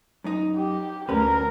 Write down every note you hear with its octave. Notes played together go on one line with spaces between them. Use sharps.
F#2 D#4
G4
D2 C#4 A#4 B4